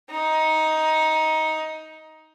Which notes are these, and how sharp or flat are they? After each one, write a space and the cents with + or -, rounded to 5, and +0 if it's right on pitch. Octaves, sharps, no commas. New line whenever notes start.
D#4 +15